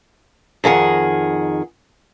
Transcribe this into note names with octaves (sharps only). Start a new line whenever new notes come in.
F2 D#3 G#4 F#5